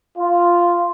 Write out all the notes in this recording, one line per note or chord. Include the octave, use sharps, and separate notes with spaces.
F4